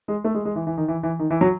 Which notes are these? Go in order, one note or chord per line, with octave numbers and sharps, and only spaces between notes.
G#3
A3
G#3
G#3
E3
E3
D#3
E3
E3
D#3
E3
F#3